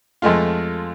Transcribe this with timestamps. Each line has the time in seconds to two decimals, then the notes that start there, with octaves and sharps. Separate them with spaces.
0.22 F2 G#3 A3 F4